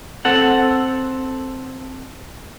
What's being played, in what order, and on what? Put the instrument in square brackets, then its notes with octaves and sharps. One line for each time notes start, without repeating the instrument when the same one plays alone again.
[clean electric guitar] C4 A4 F#5